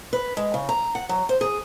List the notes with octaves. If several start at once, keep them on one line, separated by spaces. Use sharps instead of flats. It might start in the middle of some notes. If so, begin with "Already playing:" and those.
B4
G#3
C#3
A#5
F#5
F#3
C5
G#4